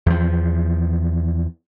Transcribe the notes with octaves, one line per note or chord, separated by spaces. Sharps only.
E2 F3